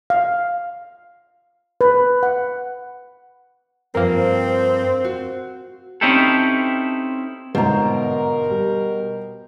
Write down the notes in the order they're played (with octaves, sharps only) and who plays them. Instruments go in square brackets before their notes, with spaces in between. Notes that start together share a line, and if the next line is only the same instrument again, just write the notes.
[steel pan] F5
B4
F#5
[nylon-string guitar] G2 F3 G5 [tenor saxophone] C4 [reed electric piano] A#4 F5
[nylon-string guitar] F#4
[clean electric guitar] C4 C#4 D#4 E4 G4 A4
[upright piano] G1 G#2 [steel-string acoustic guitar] B2 [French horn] A#4 [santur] C5 A#5
[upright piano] G3